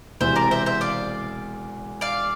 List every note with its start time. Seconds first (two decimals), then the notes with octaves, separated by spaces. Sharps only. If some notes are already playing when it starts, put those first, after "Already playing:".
0.21 E1 E2 C3 C5 E5
0.36 A#4 D5
0.51 C5 E5
0.66 C5 E5
0.81 D5 F5
2.01 D5 F5